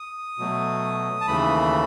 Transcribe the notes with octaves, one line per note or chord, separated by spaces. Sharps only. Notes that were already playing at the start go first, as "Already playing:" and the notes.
Already playing: D#6
B2 F#3 A3
A5
D#2 C#3 E3 A3 B5